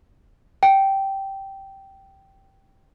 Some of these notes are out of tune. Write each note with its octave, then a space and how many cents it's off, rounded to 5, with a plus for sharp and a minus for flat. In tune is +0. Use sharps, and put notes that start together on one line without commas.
G5 -10